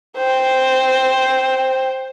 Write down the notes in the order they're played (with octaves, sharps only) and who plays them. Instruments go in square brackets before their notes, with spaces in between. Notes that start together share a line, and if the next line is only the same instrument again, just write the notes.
[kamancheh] C5 G5